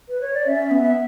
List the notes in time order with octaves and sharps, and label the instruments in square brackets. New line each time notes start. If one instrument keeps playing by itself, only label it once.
[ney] B4
C#5
D5
[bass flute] C#4 [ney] E5
[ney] E5
[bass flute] B3
[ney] E5